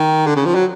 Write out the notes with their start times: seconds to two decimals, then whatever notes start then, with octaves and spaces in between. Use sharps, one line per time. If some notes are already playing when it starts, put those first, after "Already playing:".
Already playing: D#3
0.26 D3
0.36 C#3
0.46 F3
0.55 F#3